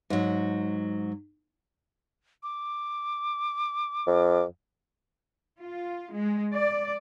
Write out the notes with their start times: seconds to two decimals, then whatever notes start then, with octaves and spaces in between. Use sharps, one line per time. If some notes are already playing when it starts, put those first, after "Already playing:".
0.10 G#2 F#3
2.43 D6
4.07 F2
5.60 F4
6.15 G#3
6.55 D5